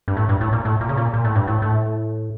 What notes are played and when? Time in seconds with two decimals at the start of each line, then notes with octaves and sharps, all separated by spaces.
0.08 G2
0.17 A2
0.29 G2
0.41 A2
0.53 A#2
0.65 A2
0.81 A#2
0.89 C#3
0.97 A#2
1.14 A#2
1.25 A2
1.36 G2
1.47 A2
1.62 A2